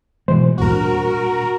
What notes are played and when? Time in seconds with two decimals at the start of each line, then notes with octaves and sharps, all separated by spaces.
0.28 B2 E3 G#3 C5
0.58 G#1 E2 A#2 G3 F#4 A#4
0.73 D4